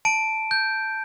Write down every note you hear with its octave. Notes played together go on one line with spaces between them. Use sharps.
A5 D7
G6